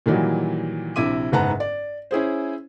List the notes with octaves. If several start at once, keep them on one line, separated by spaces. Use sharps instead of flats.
A#2 D#3 E3 F#3 G3
A#1 C3 E4 E5 D6 D#7
F#1 G#2 B4 F#5 A5 A#5
D5
C#4 E4 G#4 C5